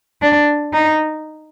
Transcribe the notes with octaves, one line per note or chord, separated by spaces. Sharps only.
D4
D#4